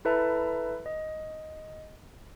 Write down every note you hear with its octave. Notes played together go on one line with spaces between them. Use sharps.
E4 A4 B4 E5 A5 A#5
D#5